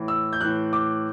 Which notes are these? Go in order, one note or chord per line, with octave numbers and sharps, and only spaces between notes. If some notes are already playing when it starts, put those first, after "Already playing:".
Already playing: A2 E3
E6
G6
A2 E3 F#6
D6